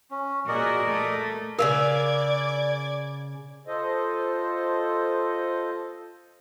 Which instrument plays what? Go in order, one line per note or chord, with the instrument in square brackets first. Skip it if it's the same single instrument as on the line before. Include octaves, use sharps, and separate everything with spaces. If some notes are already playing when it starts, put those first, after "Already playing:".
[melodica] C#4
[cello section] A#2 F#4 G#4 [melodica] A#4 D5 D#5
[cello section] A3
[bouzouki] C#3 F#3 F5 [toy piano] A#4 [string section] D5 D6 G#6
[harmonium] F4 A4 C5 D#5